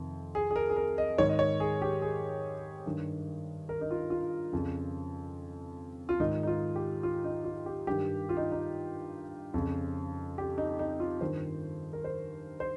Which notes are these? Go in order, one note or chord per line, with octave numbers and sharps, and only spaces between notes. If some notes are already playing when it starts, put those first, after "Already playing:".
Already playing: F2 C3 D#3
G#4
G#4
A#4
G#4
A#4
D#5
G#2 D#3 C#5
D#5
C#5
G#4
G4
G#4
G2 D#3
A#4
D#4
F4
F4
F2 C#3
F4
G#2 D#3 D#4
D#4
F4
G4
F4
D#4
F4
G4
G2 D#3 G4
F4
D#4
D#4
F2 C#3
G4
D#4
D#4
F4
G2 D#3 C5
A#4
C5
C5